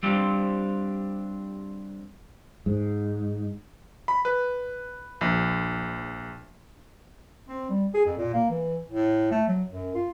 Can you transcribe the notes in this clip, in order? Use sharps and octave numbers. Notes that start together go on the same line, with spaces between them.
G3 C4 D4 F4 G4 C5
G#2
B5
B4
A#1
C4
G3
G#4
F2
A#2
A#3
E3
A2
A3
F#3
F#2
F4